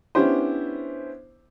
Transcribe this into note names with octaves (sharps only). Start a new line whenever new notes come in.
B3 C#4 D4 E4 G4 C5